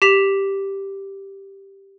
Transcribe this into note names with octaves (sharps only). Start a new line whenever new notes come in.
G4 B6 F7